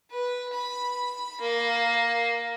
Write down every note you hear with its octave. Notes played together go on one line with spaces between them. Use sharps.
B4
B5
A#3